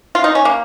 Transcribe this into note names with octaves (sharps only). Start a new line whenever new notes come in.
F4
D#4
C#4
A#3